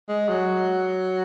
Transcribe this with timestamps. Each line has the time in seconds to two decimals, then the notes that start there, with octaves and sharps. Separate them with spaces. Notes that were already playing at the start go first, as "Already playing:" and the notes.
0.09 G#3
0.29 F#3